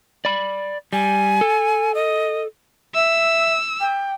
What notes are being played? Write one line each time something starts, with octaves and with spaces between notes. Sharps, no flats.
D5 B5
G3 G#5
A4
D#5
E5 E6
G5